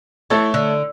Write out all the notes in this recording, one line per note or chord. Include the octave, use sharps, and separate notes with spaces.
E3 A3 A4 C#5
D3